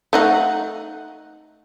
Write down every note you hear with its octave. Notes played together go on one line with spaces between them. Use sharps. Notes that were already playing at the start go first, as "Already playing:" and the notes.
A3 D#4 F#5